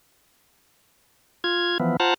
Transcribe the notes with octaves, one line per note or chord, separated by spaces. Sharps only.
F4 G#6
E3 F3 B3
F4 C5 F#5 A5 A#5